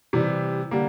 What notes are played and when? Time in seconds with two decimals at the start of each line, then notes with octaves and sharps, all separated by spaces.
0.13 C3 E3 G3
0.71 D3 G3 A#3